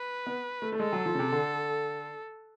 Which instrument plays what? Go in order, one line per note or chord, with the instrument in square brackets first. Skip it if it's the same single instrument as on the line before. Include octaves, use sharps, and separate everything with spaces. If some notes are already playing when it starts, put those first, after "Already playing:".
Already playing: [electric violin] B4
[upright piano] B3
A3
A3
[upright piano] G#3 [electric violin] A4
[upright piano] F#3
F3
C#3
C3
D3